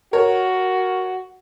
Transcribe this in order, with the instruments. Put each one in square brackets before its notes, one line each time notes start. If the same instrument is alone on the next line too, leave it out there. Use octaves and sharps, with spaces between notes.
[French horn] F#4 [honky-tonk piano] A#4 C#5